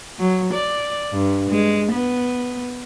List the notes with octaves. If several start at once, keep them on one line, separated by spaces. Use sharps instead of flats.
F#3
D5
G2
G#3
B3